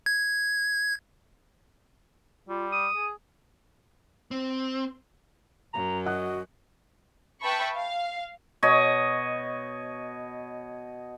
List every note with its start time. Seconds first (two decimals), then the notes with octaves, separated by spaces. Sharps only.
0.06 G#6
2.49 G3 F4
2.72 D#6
2.96 G#4
4.31 C4
5.74 F#2 A#5
6.06 F#4 D#5 F#5 F#6
7.42 B4 E5 G5 A5 B5 C#6
7.75 F5
8.63 B2 C#5 D#5